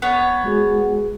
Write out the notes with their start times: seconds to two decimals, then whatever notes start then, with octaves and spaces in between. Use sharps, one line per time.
0.02 B3 C#5
0.44 G#3 F#4 G#4